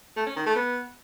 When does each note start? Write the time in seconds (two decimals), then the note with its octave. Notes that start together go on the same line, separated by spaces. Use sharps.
0.17 A3
0.26 C#4
0.36 D#3
0.46 A3
0.56 B3